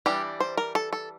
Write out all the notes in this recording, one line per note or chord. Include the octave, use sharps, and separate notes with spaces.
E3 G3 D4 G4
C5
A#4
A4
A4